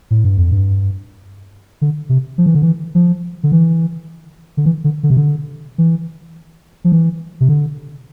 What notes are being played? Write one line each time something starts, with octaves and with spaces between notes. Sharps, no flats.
A2
G2
F2
G2
D3
C3
F3
E3
D3
E3
F3
D3
E3
D3
E3
D3
D3
C3
D3
E3
F3
E3
C3
D3